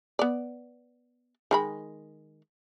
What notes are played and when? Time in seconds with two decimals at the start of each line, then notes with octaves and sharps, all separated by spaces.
0.19 B3 D5
1.51 D#3 G#3 B5